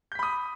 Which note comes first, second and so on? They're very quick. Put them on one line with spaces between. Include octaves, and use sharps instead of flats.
G6 B6 B5 D#6